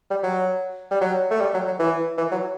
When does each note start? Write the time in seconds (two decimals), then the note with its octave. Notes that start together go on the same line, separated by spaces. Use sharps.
0.10 G3
0.23 F#3
0.91 G3
1.01 F#3
1.31 A3
1.41 G3
1.54 F#3
1.67 F#3
1.79 E3
2.18 E3
2.31 F#3